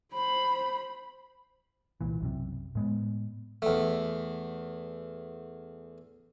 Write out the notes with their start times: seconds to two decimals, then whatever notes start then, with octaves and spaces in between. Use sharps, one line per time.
0.14 C5 B5
2.01 C2 A#2 E3
2.21 B1 F#2 C3
2.75 A2 G#3 B3
3.62 E2 A3